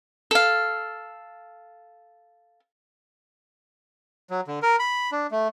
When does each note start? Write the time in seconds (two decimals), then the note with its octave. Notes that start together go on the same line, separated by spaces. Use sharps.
0.31 A4 F5
4.30 F#3
4.48 D3
4.62 A#4
4.79 B5
5.12 D4
5.31 A3